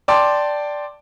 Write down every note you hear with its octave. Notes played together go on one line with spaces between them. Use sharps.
D5 G5 A5 C6 D6